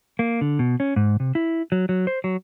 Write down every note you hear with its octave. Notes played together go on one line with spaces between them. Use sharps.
A#3
D3
B2
C#4
G#2
C3
E4
F#3
F#3
C5
F#3